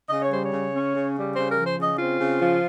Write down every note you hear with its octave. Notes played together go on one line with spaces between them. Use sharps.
C#3 D#5
C#5
G3 C5
C#5
C#3
C#4
C#3
G3
C#3 C5
F3 A#4
C5
C#3
D#5
C4 F4
C#3
F3